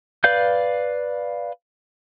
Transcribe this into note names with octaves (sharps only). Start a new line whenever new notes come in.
B4 D5 F5 G6